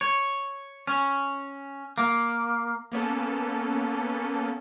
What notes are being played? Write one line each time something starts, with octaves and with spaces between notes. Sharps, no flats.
C#5
C#4
A#3
A#3 B3 C#4 A4